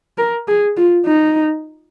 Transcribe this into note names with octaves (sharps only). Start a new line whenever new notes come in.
A#4
G#4
F4
D#4